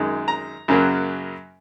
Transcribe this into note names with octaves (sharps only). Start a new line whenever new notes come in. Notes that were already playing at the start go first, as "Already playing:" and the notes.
Already playing: F#2 D#3 G#3
A#5
F#2 C#3 F#3 A#3